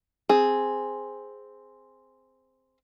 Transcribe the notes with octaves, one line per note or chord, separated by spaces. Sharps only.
C4 G#4